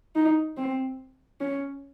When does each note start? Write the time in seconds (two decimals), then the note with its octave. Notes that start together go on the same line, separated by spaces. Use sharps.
0.16 D#4
0.57 C4
1.40 C#4